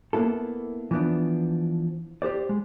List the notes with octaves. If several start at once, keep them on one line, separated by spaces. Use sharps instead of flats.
A#3 B3 E4 A4
E3 F3 B3 D4
G4 G#4 C5 D5
G#3